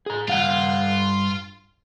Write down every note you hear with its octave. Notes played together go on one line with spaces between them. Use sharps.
G#4 A#5
G2 F4 F5 F#5